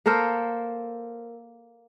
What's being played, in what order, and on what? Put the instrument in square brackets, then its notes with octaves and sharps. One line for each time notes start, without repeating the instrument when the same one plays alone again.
[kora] A#3 A4 A#4 C5